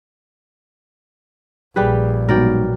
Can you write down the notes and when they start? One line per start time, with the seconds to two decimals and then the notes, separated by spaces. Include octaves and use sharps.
1.76 A#1 G3 G4 G#4 B4
2.29 G#2 B2 F#3 B3 A#4 D5 G5